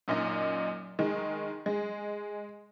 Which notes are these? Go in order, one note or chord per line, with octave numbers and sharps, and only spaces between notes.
F#2 A#2 D#4 D#5
D#3 G#3
G#3